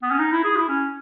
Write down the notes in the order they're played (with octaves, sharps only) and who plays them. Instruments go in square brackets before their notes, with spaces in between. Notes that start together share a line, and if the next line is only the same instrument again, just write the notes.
[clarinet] B3
C#4
D#4
E4
G#4
E4
C#4